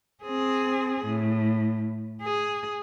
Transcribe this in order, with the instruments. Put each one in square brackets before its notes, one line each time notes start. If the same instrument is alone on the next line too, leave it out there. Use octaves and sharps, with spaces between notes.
[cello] C4 G#4
A2
G#4